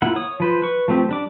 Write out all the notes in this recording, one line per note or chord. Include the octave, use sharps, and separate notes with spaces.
A#3 E4 F4 F#5
C#5 D#6
F3 B4 C5
B4 C#6
F3 A3 C4 G4
G3 D4 D6